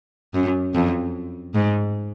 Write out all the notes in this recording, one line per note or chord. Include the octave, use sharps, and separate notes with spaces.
F#2
F2
G#2